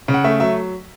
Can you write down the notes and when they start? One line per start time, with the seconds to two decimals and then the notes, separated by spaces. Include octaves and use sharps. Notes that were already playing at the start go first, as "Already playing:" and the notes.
0.08 C#3
0.14 F#5
0.24 A3 E5
0.40 F#3 E5